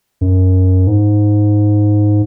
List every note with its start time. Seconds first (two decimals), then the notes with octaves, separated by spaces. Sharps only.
0.21 F#2
0.87 G#2